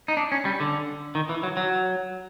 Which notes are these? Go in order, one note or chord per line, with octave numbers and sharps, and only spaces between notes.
D#4
D4
C#4
G3
D3
D#3
E3
F#3
F#3